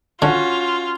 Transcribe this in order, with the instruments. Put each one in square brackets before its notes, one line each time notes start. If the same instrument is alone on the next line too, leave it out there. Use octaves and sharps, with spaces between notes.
[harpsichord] D3 [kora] C#4 F#4 [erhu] F4